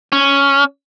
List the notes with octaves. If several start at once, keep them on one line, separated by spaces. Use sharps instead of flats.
C#4